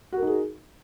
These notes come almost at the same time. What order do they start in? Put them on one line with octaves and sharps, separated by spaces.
F#4 A#4 D#4 G#4